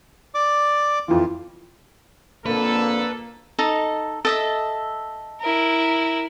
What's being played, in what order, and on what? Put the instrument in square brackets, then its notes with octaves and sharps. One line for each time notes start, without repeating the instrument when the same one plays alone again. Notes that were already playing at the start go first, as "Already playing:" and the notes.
[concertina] D5 D6
[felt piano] F2 E3 [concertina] F4
[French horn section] F2 A#2 D3 [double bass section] A#3 [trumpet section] A4 [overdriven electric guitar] B4
[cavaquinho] D#4 A4 D#5
A4 D#5 E5
[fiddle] E4 A#4